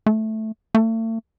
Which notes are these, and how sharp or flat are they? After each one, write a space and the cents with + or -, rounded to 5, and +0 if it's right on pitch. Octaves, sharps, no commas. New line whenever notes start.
A3 -5
A3 +40